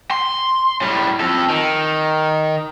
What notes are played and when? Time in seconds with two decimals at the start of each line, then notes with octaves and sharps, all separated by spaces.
0.11 C6
0.81 A2 G3
1.20 F2 A4
1.50 D#3